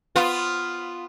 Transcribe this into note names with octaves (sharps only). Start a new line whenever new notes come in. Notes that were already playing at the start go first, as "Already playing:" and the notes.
B3 F4